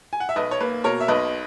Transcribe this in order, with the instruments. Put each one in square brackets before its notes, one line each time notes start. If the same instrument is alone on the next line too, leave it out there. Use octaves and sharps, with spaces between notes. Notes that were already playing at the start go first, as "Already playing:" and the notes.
[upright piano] G#5
F#5
E5
B1 B4 D#5
C#5
A#3 B4
B2 A#4 C#5
E5
B1 B4 D#5